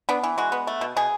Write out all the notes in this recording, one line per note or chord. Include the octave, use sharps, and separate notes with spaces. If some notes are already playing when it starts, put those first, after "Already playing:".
B3 D4
E3
G#3 F#4
B3
A3
B2
B2 G#4